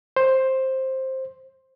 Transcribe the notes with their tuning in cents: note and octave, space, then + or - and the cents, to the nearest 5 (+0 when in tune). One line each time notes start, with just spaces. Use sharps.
C5 +10